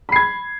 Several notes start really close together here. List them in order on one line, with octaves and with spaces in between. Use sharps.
B5 C7 G#6